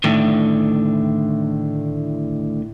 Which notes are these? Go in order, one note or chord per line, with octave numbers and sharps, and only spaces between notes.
A2 D3 D#3